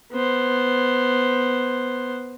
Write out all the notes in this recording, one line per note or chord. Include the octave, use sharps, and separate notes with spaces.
B3 C5